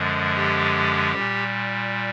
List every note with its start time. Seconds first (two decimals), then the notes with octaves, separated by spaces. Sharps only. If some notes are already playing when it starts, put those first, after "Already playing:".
Already playing: F#2 D3 F3 G#3
0.36 G4
1.13 A#2 G3